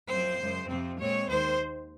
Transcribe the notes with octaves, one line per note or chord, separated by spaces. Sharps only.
F#2 F3 C4 C5
F#2 C#3 G#3
F2 C3 F3 C4
A#2 G#3 C4 C#5
D#2 D#3 G#3 C5